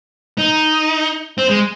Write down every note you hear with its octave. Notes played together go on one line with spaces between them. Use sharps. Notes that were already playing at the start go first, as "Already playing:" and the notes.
D#4
C4
G#3